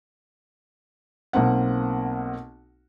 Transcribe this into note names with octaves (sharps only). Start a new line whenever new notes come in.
B1 A#3 C4 F#5